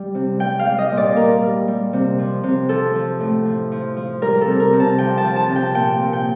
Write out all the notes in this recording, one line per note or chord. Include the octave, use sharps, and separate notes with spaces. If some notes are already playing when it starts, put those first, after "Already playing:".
Already playing: G3
C3
G3 G5
F5
G3
D#5
A#2
D5
A#2 A#4
G3
G3
C3
F3
C3
F3 A4
F3
A2
F3
F3
F3
G3 A#4
A4
C3
A#4
C3
A5
F3 G5
A5
F3
A5
C3
G5
A#2 G5
A#2
G5